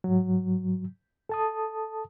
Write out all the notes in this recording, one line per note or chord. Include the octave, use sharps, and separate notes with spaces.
G#2 F#3
A4 A5 D#6